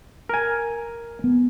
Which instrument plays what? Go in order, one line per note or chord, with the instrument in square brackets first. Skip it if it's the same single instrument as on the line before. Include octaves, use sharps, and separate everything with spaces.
[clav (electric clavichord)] A#4 G#5
[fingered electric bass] B3